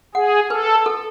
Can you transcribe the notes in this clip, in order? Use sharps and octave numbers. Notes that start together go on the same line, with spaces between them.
G#4 F#5
A4 B4
A4